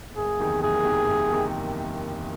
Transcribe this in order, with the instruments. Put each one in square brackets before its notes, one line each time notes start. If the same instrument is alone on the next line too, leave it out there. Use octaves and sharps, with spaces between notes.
[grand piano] F#1 [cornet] G#4
[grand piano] E2 C3 D#3
[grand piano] F#1 [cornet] G#4
[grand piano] E2 C3 D#3
F#1
C3 D#3